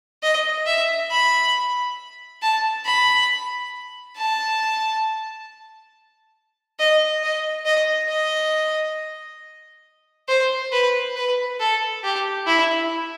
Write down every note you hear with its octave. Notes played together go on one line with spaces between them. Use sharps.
D#5
E5
B5
A5
B5
A5
D#5
D#5
D#5
D#5
C5
B4
B4
A4
G4
E4